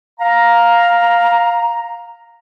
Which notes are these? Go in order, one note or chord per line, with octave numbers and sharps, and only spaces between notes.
F5 A#5